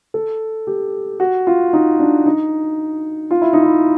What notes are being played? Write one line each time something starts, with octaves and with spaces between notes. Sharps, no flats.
A4
G4
F#4
F4
D#4
D4
D#4
F4
E4
D#4
E4